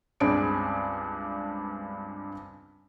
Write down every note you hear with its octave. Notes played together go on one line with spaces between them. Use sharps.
C#2 G2 C4 D4 G#4 D7